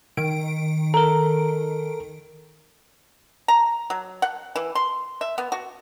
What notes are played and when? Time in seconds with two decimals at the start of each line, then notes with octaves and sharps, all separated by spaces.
0.17 D#3 D7
0.94 A4 A#4 A#5
3.48 A#5
3.90 F#3
4.22 F#5
4.56 E3
4.75 C6
5.21 E5
5.38 B3
5.52 F#4